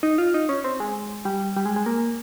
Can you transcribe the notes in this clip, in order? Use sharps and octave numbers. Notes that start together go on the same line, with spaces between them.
D#4
F4
D#4
C#4
C4
G#3
G3
G3
G#3
G#3
A#3